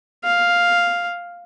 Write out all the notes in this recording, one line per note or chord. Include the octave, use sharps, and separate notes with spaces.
F5